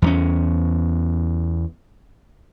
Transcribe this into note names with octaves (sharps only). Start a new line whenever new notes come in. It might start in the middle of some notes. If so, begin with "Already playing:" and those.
E2 A3 C#4